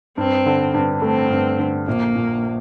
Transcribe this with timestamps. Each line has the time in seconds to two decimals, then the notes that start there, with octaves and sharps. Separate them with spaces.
0.18 G2 C4
0.46 D3
0.74 G2
1.02 A3 C4
1.30 G2
1.59 D3
1.88 A#1 A#3
2.16 A#2